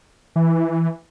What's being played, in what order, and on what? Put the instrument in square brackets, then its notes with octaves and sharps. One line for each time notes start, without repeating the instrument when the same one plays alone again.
[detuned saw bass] E3